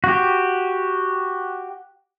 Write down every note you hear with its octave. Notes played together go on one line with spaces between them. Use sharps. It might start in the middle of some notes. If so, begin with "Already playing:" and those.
F#4 G4